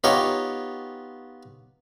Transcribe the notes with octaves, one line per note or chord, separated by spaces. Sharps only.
B3 D#4 F4 G4 C#5 G5